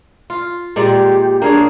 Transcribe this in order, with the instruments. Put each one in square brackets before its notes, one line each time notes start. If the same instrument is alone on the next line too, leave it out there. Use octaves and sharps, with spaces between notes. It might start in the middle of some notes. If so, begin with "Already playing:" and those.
[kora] F4
[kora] A#2 G#3 D5 [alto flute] G4
[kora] A#3 G#4 C#5 [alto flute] D4